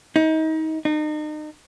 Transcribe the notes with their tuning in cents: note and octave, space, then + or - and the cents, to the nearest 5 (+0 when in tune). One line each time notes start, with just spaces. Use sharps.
D#4 +30
D#4 -35